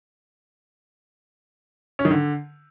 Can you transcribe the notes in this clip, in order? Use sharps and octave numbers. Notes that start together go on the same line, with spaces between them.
C#4
D#3
D3